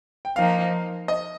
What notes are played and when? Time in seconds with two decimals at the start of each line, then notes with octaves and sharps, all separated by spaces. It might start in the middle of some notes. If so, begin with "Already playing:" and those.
0.25 G5
0.36 F3 A#3 D#4 F5
1.08 D#5